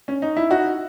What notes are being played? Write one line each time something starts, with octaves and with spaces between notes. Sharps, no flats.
C#4
D#4
E4
D#4 F#4